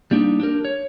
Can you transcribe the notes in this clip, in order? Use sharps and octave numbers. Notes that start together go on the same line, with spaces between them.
G3 A#3 D4 D#4
D4 G4 A#4
C#5